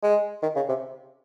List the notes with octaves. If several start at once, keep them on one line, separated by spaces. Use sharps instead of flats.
G#3
D#3
C#3
C3